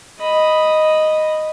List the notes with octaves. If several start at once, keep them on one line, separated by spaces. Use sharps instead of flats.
D#5 B5